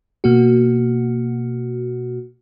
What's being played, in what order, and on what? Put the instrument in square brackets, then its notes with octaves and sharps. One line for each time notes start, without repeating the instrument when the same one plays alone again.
[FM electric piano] B2 A#3 F#4